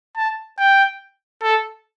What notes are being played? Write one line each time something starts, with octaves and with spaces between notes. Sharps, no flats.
A5
G5
A4